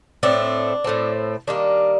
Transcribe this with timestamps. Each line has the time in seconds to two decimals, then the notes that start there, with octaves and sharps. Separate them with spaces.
0.23 A2 A3 C4 D4
0.84 A2 A3 C4
1.47 D#3 G3 A#3 D4